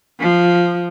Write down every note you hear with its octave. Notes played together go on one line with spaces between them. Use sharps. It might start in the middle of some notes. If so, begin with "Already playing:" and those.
F3